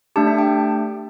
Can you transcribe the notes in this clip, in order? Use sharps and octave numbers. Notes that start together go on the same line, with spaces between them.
A3 D4 G4 A5
E5
G5